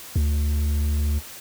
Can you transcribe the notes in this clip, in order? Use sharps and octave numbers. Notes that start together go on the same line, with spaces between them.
D2